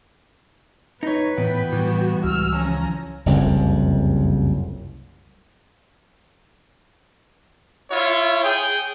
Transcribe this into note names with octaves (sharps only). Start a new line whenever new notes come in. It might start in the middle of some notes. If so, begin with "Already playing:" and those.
D#4 B4 C#5
E2 A2 B3 G5
A2 E3 G3 F#4
C#2 E6 F6
C#3 F3 C#4 A#5
F#1 C2 F2
E4 F4 C#5
G#4 G5